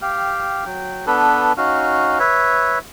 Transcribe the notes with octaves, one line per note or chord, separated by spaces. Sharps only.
G4 F5 G5
F#3 G5
B3 D4 A4 B4
C#4 D#4 F#4 F5
B4 C#5 E5